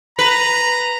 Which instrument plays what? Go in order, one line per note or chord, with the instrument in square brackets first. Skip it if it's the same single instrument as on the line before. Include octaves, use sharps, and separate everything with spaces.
[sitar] B4 [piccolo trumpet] A#5